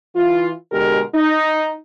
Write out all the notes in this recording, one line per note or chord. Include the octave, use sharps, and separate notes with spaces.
E3 F4
B2 D3 G#3 G4 A#4
D#4